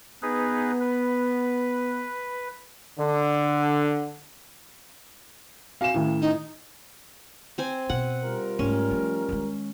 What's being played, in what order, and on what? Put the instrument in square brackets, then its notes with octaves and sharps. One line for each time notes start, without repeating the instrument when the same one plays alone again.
[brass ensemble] B3 [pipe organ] D#4 G#4 B4
[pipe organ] B4
[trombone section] D3
[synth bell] C4 F#4 G#5 [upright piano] F5 E7
[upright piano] A2 [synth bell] D#3 C#4
[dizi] D#4
[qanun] C4 C5 G#5
[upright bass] B2 [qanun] F#5
[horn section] G3 F4 A#4
[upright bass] G#2 A3 [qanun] C#4
[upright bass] F3 A3
D#3 G#3